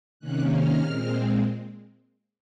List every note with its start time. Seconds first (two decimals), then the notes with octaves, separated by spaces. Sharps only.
0.19 C3 D#3 A#3 C#4 F#6
0.50 F6
0.81 A#2 G#3 C4